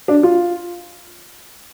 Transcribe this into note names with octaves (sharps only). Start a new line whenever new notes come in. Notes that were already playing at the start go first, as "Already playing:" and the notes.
D4
F4